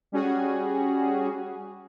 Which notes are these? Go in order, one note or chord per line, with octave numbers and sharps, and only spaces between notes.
G3 C#4 F#4 G#4